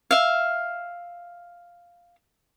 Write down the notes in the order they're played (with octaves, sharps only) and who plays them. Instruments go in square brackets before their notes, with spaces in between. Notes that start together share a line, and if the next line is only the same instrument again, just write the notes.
[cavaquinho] E5 F5